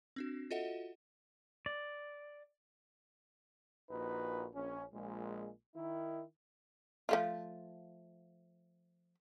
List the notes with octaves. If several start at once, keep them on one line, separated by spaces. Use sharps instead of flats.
C4 D4 F#4
F4 F#4 A4 D#5 E5 F#5
D5
A#1 A#2 D#4 F#4 B4
A#1 C#4
A#1 A#2 G#3
D#3 E4
F3 A3 F4